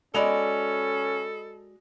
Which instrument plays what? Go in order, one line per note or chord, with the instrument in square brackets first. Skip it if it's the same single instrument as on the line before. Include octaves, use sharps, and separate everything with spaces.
[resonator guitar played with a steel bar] G#3 F#4 D5 [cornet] C#4 [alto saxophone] A4 [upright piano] D#5 B5 F7